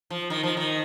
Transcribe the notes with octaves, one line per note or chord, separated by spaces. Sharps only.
F3
D#3
F3
D#3